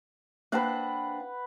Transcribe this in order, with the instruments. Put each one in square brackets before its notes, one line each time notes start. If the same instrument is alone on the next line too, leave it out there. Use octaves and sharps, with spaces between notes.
[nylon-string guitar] A#3 C4 D4 [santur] B4 F#5